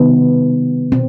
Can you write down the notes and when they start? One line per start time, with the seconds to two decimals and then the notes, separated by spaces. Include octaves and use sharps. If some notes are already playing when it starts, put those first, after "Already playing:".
Already playing: C3 D#3 G3 B3
0.92 B2 C4